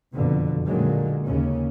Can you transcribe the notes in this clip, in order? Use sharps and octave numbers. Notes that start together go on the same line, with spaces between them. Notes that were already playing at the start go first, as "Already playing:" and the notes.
F#1 F2 B2 D3
A#2 D3 D#3 F#3 G#3 A#3
D#2 C#3 C#4